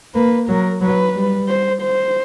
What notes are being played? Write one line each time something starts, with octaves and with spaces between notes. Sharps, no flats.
A#3 B4
F#3 A#4
F#3 B4
G3
C5
C5